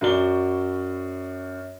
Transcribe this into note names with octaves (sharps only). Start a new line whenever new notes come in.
F#2 F#4 D5 G7